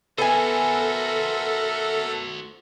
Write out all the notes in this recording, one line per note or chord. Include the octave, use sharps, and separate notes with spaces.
B3 F#4 A4 A#4 C5 E5 G#5